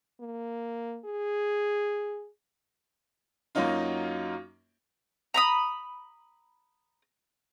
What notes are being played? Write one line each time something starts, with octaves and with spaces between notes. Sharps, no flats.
A#3
G#4
F#2 F#3 A#3 C#4 D#4 F4
A#5 B5 D#6